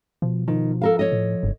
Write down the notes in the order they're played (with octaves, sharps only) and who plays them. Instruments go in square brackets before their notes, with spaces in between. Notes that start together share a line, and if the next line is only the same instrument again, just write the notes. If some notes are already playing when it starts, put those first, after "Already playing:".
[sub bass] B2 [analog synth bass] F3
[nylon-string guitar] D#3 [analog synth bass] F3
[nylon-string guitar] A4 A#4 F5
C#5 D#5
[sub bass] A2
[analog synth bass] F#1 [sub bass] G2